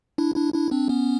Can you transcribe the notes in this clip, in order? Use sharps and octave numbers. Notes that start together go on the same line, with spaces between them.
D4 E4
D4 E4
D4 E4
C4 D4
B3 C#4